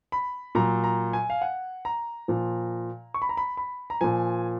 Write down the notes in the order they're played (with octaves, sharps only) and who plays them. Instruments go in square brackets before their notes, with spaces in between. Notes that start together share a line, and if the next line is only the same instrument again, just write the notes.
[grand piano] B5
A#2 F#3 A#5
A#5
G#5
F5
F#5
A#5
A#2 F3
C#6
B5
A#5
B5
B5
A#5
A#2 F3 G#5